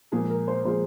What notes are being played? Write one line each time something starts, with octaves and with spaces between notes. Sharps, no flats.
A#2 F3 G#3 G#4
A#4
C5
A#2 F3 G#3 C5